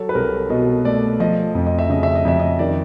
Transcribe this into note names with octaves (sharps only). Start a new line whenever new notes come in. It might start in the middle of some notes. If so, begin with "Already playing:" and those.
Already playing: F#3 A4
B4
C2 A#4
B2 D#5
A3 D5
F3 D#5
F2
D#5
E5
C#3 D#5
E5
D#5
F2 E5
D#5
D#3 D5